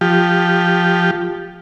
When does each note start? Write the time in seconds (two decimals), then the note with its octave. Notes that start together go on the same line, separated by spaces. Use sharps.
0.01 F3 G4